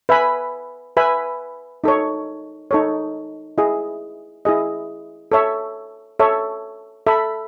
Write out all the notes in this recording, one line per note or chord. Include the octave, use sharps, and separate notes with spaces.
B4 E5 G#5 B5
B4 E5 G#5 B5
D#4 A4 C#5
D#4 A4 C#5
E4 G#4 D#5
E4 G#4 D#5
A4 C#5 E5
A4 C#5 E5
A4 E5 B5